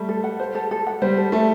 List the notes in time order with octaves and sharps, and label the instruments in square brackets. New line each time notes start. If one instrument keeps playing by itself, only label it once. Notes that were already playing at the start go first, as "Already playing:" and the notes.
Already playing: [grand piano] G3 A3
[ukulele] A4
F#5
C5
A4
A4
F#5
[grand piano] G3 [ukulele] C5
[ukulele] A4
[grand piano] A3 [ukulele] A4